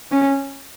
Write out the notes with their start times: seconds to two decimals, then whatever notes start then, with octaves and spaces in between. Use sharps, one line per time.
0.12 C#4